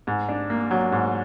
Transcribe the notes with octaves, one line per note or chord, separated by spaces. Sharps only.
G#2
D4
A#3
F#3
G#2